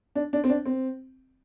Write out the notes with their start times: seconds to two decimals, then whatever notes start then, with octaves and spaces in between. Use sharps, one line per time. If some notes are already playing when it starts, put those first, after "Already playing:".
0.15 D4
0.33 D4
0.44 C4
0.49 D4
0.65 C4